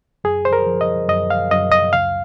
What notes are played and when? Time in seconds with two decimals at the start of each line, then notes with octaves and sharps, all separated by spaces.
0.24 F#2 G#4
0.45 C5
0.53 A#4
0.66 F3
0.81 D#5
1.09 F#2 D#5
1.30 F5
1.51 F#2 D#5
1.72 D#5
1.93 C#2 F5